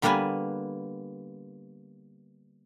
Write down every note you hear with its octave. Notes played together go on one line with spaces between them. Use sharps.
D3 G3 A#3 B3 B4 G#5